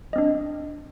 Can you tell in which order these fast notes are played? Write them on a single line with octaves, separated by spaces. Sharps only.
D#5 C4 D4